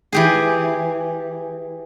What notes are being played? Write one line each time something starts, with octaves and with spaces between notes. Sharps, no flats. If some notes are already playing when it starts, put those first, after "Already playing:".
E3 G4 G#4